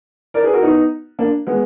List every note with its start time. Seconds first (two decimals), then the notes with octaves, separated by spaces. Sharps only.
0.34 A#4 D5
0.44 G#4 B4
0.53 F#4 A#4
0.62 B3 D#4
1.19 A#3 D4
1.47 G#3 B3